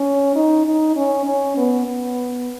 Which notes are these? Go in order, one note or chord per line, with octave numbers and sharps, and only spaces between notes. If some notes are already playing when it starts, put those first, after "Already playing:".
Already playing: C#4
D#4
D#4
C#4
C#4
B3
B3